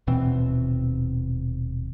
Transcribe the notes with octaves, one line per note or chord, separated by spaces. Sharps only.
D#1 B2 E3 C4